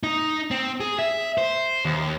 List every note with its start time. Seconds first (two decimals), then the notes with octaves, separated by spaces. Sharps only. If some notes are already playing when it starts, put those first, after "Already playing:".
0.03 D#4
0.51 C4
0.80 G#4
0.99 E5
1.38 C5
1.85 D#2